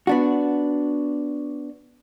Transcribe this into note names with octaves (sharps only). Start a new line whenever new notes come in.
B3 D4 F#4